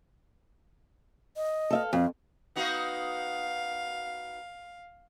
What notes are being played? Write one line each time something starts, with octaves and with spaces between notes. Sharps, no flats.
D#5
A4 E5 F5
F2 F5
B3 D#4 F#4 F5